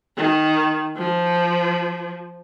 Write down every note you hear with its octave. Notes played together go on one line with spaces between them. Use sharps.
D#3
F3